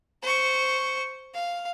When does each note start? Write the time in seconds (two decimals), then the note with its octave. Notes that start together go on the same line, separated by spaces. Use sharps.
0.23 C5 C#6
1.34 F5